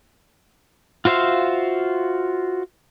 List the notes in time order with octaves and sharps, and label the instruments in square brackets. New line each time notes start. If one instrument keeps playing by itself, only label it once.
[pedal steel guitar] F4 F#4 C5 E5 F5